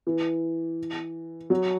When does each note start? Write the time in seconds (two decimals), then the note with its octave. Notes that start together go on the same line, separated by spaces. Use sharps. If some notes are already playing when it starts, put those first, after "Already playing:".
0.07 E3
1.50 F#3